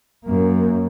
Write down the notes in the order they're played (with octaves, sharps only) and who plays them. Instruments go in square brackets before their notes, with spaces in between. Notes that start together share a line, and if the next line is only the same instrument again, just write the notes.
[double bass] F#2 A#3